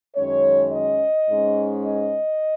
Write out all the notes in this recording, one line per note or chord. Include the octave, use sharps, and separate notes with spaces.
F#2 D#3 G#3 C#4 C#5
D#5
G#2 G#3 C#4
D#5